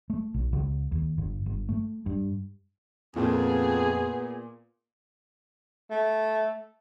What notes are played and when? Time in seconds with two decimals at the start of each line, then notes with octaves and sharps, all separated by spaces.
0.10 A3
0.34 B1
0.53 C#2
0.92 D#2
1.18 G1
1.46 G1
1.69 A3
2.06 G2
3.16 F2 A#2 B3 G#4
5.91 A3